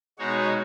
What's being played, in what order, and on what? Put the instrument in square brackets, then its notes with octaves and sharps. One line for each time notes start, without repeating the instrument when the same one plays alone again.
[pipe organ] B2 G#3 D#4 F#4 C#5